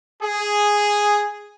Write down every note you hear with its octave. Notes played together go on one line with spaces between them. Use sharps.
G#4